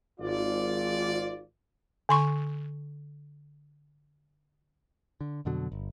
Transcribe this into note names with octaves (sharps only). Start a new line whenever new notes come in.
G#1 F4 D5
D3 C6 C#6
D3
F2 B2 D3 F#3
G1